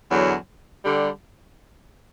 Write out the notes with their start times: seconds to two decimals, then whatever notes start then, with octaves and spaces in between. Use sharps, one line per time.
0.09 E2 D3 F#3
0.84 D3 G3